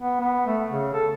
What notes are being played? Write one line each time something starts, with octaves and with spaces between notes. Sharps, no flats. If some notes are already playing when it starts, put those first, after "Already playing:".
B3
B3
A3
C#3
A4